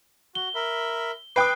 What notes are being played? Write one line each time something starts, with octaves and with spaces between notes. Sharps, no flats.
F#4 G7
A#4 E5 B5
B4 G5 D6 D#6 F#6 C7